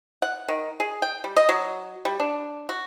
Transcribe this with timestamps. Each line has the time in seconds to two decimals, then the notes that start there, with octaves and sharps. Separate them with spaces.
0.22 F#5
0.48 D#3
0.80 G#4
1.02 G5
1.24 G3
1.36 D#5
1.49 F#3
2.05 G3
2.20 D4
2.69 F#4